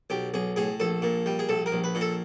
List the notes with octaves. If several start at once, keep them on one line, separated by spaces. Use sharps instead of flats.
B1 G4
B1 G#4
A2 G#4
A#1 A4
A#2
G3
G#4
A#1 A4
A#4
A#1
B4
A#2
A4